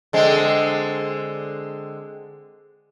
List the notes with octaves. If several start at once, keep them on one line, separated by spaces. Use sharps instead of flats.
D3 G#3 C4